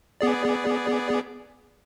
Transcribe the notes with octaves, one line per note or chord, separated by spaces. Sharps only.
B3 G#4 D5